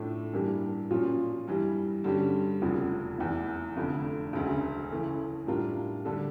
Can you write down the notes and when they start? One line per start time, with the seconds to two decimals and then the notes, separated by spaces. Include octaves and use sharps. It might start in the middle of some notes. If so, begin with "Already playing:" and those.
Already playing: A2 F3 A3 D4
0.33 G2 E3 A#3 D4 G4
0.90 A#2 F3 C#4 F4
1.48 G2 E3 G3
2.04 G2 D3 G3 C#4 G4
2.62 F1 E2 C#3 F3
3.19 F1 E2 E3
3.77 F1 F2 D3
4.33 E1 D2 C#3
4.91 C#3 E3 A3 C#4
5.47 A2 G3 D4 F4 A#4
6.05 D3 G3 D4 A4